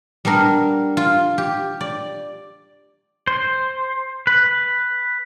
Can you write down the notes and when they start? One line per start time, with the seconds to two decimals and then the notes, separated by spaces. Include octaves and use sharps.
0.25 G3 B3 D4 A#4
0.97 F4
1.38 G4
1.81 D5
3.27 C5
4.27 B4